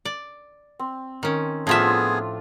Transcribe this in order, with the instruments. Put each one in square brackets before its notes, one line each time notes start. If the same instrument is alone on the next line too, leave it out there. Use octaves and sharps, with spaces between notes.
[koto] D5
[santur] C4
[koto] D#3 C#4
[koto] A2 F3 E5 [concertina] B3 G#4 [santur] D4 F4